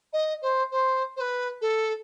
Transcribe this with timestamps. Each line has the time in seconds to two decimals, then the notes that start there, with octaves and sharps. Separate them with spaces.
0.13 D#5
0.42 C5
0.72 C5
1.16 C5
1.20 B4
1.61 A4